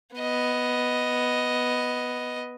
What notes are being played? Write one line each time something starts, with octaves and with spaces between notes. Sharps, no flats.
B3 D#5